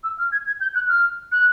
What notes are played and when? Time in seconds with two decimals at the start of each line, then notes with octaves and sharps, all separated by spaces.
0.04 E6
0.18 F6
0.32 G#6
0.47 G#6
0.60 G6
0.75 F#6
0.89 F6
1.32 F#6